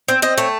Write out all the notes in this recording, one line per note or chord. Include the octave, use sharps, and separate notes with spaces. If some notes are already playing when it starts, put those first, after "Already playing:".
C4
C4 D#5
A3 C#5